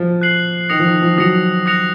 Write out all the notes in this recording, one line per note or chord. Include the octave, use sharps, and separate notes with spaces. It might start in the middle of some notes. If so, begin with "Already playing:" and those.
Already playing: F3
F#6 C7 F#7
D#3 D#6 A#6 C#7 F7
F3
D#3
F3
F#3 D#6 A#6 C#7 F7
D#6 F#6 A#6 C#7 F7